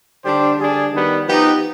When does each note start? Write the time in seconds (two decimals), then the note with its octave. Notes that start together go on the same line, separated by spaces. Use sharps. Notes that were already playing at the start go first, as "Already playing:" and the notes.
0.24 D3 G3 D4 G4 C5
0.58 D3 G3 D4 G#4
0.93 D#3 G3 B3
1.26 F3 B3 D#4 G4 B4